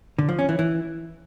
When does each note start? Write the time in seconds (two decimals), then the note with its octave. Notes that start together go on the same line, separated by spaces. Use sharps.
0.18 D3
0.29 F3
0.39 C#4
0.49 E3
0.59 E3